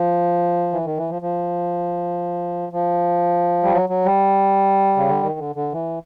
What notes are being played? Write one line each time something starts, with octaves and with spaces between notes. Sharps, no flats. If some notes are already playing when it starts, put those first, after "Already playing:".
Already playing: F3
E3
D#3
E3
F3
F3
F3
G3
F#3
F#3
G3
C#3
D3
D#3
D3
D3
E3